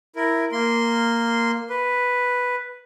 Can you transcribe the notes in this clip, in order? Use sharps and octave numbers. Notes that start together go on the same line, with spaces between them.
E4 A#4
A#3 C6
B4